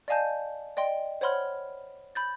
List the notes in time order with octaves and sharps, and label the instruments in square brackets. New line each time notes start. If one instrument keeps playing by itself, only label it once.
[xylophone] D5 D#5 F5 G#5 A5 G6
D5 D#5 G5 C6
C5 C#5 F#5 B5 C6 F6
B5 G6 A6